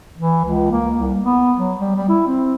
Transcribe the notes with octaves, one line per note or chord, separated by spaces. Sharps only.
E3
C#2
A#3
C2
B3
F#3
G3
G3
E4
C4